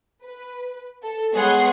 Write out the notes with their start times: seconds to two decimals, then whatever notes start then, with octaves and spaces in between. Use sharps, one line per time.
0.22 B4
1.03 A4
1.33 G#3 B3 G#4 C#5 F#5 C6